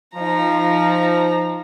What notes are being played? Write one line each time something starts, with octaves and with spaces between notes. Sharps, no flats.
F3 D#4 A#5